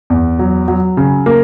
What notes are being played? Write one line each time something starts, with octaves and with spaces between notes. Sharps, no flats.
E2
F#3
F#3
C#3
A#3